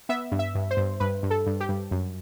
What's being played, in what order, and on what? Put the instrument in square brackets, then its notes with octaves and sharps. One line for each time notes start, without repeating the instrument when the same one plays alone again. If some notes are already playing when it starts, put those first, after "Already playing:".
[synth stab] B3 E5
G2
E5
G2
C5
G2
G2 B4
G2
A4
G2
G4
G2
F#2